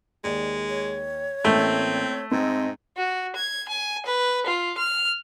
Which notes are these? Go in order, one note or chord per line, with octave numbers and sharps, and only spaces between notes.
D#2 G#3 D5
C#5
A1 A3 A#3 C4 G7
G#2 C4 D#5
F#4
G#6
G#5
B4
F4
F6